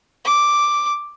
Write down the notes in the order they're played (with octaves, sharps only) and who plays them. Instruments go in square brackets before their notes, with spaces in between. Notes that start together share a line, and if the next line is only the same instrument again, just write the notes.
[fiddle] D6